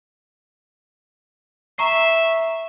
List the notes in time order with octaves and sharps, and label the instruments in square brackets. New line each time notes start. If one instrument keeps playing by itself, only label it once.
[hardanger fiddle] E5 [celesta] A#5 C#6 C7